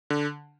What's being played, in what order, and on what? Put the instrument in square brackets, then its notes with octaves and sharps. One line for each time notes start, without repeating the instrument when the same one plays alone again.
[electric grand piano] D3